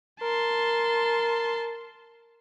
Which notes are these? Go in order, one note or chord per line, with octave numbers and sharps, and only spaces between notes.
A#4 A5 C6